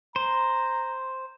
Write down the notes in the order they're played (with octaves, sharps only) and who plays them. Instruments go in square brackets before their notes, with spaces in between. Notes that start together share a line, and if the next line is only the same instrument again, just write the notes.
[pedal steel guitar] C5 [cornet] A#5